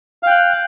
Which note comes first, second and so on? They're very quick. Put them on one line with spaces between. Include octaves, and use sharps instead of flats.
F5 G5 F#6